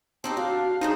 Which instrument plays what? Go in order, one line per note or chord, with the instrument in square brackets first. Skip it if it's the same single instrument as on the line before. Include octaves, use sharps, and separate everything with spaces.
[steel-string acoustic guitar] C4 D#4 G4 [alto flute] A5
[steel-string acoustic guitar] D4 [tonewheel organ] F#4 [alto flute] F5
[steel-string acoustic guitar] F#2 G#4 C5 [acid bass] D#4